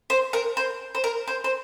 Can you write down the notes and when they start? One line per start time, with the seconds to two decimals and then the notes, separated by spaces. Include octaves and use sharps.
0.10 C5
0.33 A#4
0.57 C5
0.95 C5
1.04 A#4
1.28 C5
1.44 C5